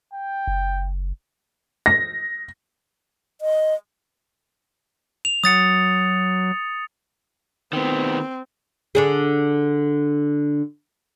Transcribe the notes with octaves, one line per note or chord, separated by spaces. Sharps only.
G5
F#1
A#6
D#5
F7
F#3 D#6 A6 C#7
D#3 B3 C4
D3 D4 G#4